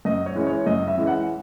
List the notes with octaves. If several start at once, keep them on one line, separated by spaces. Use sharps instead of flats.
F#2 D#5
C#5
E3 G#3 C#4
C#5
F#2 D#5
E5
E3 G#3 C#4
F#5